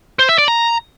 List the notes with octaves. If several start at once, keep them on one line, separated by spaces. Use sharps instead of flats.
C5
E5
D5
A#5